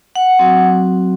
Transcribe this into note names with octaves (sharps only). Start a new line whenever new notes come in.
F#5
F#3 C4 F#4